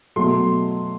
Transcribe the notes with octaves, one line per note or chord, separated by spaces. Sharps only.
B2 F#3 A3 C6